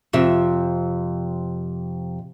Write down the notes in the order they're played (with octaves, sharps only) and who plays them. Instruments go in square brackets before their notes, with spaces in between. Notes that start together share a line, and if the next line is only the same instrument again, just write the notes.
[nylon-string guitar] F2 C3 E5